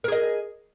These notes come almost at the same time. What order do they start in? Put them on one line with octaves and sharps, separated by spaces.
A#4 G#4 D#5